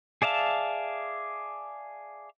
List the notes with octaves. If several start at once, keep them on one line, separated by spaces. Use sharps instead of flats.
G#4 D5 E5 F5 A5